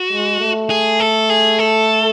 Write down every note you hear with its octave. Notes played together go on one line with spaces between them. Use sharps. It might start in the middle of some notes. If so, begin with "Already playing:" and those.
Already playing: F#4
G#3
A3
G#4
A4
G#4
A4